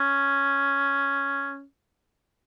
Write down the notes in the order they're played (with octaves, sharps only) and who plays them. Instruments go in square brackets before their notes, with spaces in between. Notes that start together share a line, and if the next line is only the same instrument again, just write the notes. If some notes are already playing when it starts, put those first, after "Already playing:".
Already playing: [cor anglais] C#4